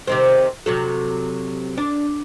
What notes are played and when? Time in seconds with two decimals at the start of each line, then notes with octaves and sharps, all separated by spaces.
0.07 C3 D#3 C4
0.66 C3 F#3 A4
1.78 D4